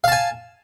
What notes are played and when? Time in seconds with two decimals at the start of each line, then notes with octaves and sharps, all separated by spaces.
0.04 F5
0.08 A5
0.12 G#5